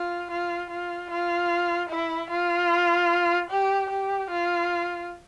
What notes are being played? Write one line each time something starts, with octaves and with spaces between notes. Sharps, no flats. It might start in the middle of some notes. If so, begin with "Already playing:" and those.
Already playing: F4
F4
F4
F4
E4
F4
G4
G4
F4